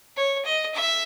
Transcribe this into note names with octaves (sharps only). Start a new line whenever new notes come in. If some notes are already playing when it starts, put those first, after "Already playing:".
C#5
D#5
E5